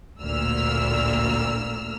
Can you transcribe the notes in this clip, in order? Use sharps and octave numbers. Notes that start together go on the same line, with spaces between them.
A1 D2 A#2 A#3 E6 F6